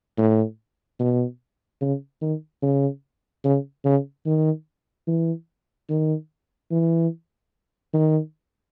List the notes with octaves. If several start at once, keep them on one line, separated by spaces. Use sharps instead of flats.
A2
B2
C#3
D#3
C#3
C#3
C#3
D#3
E3
D#3
E3
D#3